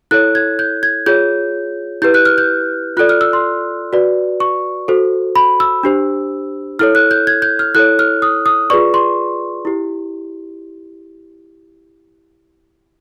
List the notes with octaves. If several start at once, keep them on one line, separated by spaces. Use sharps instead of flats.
E4 A4 C#5 F#6
G#6
G6
G#6
F4 G#4 C#5 G6
E4 G4 B4 G6
F#6
F6
G6
F4 A4 D5 F#6
F6
E6
C6
F#4 B4 D5
C#6
F#4 A4 C5
B5
E6
D4 G4 C5
E4 A4 C#5 F6
F#6
G6
G#6
G6
F6
E4 A4 C#5 F#6
F6
D#6
D#6
F4 G#4 B4 D5 C#6
C6
E4 G4